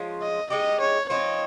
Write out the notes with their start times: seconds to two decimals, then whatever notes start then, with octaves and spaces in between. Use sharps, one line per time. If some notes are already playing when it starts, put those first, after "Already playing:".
Already playing: F3 G#3 C#4 F4
0.22 D#5
0.50 G#3 D#4 G4 D#5
0.81 C#5
1.09 F3 C4 D#4 C#5